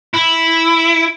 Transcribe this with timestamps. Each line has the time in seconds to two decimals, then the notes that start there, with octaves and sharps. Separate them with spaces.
0.14 E4